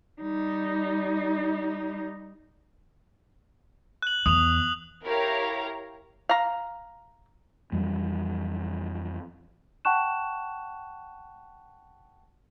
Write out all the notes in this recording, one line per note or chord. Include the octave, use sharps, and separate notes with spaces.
G3 D#4
F#6 F#7
E2 D#6 F7
E4 G4 A#4 C#5 F5 A#5
F5 A#5
F2 E3 F#3 G3
F#5 G5 A5 C#6 F#6 E7